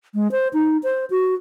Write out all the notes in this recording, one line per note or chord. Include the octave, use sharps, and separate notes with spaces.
G#3
C5
D#4
C5
F#4